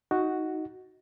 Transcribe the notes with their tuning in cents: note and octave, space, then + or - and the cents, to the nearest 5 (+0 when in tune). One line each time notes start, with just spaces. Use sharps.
D#4 +15 F#4 +0